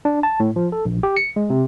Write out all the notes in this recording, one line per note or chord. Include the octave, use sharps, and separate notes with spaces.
D4
A5
A2
F3
A4
A#1
G4
C#7
G#3
C3